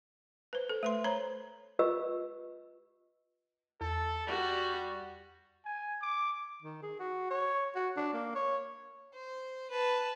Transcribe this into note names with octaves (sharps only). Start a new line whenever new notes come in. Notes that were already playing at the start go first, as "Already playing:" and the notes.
B4 C5
A4
A3 B4 C6
C5 C#5 A#5 B5
F4 G4 B4 D#5 E6
E2 A4
G3 F#4
G#5
D6
D#3
G#4
F#4
C#5
F#4
D4
A#3
C#5
C5
B4 A5